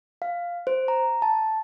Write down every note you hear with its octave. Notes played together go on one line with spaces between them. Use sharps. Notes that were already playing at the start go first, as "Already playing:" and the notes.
F5
C5
A#5
A5